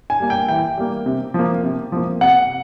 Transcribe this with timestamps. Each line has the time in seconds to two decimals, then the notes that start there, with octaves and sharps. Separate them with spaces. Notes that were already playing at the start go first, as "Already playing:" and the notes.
0.10 G#5
0.20 G3 A#3
0.30 G5
0.48 E3 G5
0.77 G3 A#3
1.06 C3
1.34 F3 A#3
1.63 C3
1.92 F3 A#3
2.21 C3 F#5